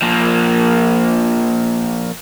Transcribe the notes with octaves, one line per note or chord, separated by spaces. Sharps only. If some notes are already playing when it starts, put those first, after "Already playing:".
F3 A#3